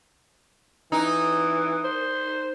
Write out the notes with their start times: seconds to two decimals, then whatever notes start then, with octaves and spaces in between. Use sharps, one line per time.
0.92 E3 D#4
1.84 C5